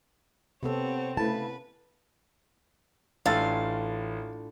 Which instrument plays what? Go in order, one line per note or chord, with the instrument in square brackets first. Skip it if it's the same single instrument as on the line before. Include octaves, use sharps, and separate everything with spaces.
[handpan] C3 B3 A4 [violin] C4 C#5
[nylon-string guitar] C#3 A3 E4 [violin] B4 [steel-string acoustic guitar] A5
[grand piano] A1 E6 A6 [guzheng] A2 D4 F4 [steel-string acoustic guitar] F5